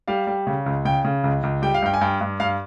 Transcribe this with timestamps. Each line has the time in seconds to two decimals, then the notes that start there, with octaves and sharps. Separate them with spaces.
0.08 G3 F5
0.27 G3
0.47 C#3
0.66 C#2
0.85 C#3 G5
1.04 C#3
1.24 C#2
1.43 C#2
1.62 G3 G5
1.74 F5
1.83 G2 G5
1.94 G#5
2.01 G2 G5
2.21 G2
2.40 G2 F5